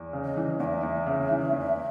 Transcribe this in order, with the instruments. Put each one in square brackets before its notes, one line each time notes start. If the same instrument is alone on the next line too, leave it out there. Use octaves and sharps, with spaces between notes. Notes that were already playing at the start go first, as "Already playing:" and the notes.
Already playing: [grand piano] E2
C#3
[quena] D#5
[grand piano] E3
[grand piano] E2 [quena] E5 F#5
[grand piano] E2
C#3
E3
E2